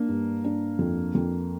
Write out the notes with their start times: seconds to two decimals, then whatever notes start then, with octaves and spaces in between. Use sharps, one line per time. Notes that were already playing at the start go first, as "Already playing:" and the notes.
Already playing: A#3 D4
0.09 G2
0.44 D4
0.79 F2
1.15 F2